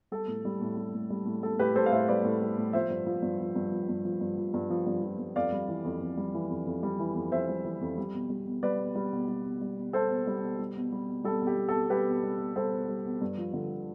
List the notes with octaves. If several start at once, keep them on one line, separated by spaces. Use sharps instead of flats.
G3 A4
A2
G3
A2
G3
A2
G3
A2
G3 A4
A2 G4 B4
G3 A4 C5
F5
A2 C5 E5
G3 B4 D5
A2
G3
A2
F3 C5 E5
G2
F3
G2
F3
G2
F3
G2
F3
G2
F3
G2
F3
G2
F3
G2
F2 D5 F5
G3
E3
F2
F2
G3
E3
F2
F2
G3
E3
F2
F2 C5 E5
G3
E3
F2
G3
B2
G3
B2
G3 B4 D5
B2
G3
B2
G3
B2
G3
B2
G3 A4 C5
B2
G3
B2
G3
B2
G3
B2
G3 A4
B2
G4
G3
A4
B2
G3 G4 B4
B2
G3
B2
G3 A4 C5
B2
G3
B2
G2
F3
D3